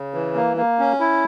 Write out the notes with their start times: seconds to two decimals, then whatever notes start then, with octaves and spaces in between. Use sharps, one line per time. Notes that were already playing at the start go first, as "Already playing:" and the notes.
Already playing: C#3
0.14 E3
0.35 A#3
0.57 A#3
0.79 C#4
1.00 E4